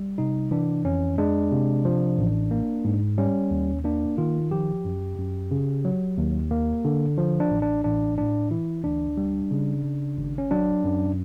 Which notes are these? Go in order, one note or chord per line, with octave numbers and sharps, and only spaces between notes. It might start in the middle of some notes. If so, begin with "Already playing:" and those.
Already playing: G3
C3 D#4
E3 D4
F2 C#4
G#3 D4
C3
F3
A1
A#3
G#2
G3 C#4
D#2
A#3 D4
D#3 F4
F3 G4
F#2
F#2
C#3
F#3
D#2
A#3
D3
F3
D4
A1
D4
A1 D4
A2 D4
E3 E4
D2 D4
G3
C#3
C#3
G#1
C#4
F#3 D4
F#2